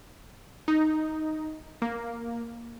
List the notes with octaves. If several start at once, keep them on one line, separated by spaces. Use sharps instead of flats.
D#4
A#3